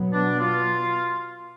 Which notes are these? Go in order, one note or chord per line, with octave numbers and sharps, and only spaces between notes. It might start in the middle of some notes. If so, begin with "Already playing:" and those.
Already playing: B2 F#3 B3
D4
F4